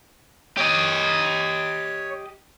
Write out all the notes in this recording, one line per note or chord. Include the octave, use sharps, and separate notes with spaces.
G4 C#5 D#5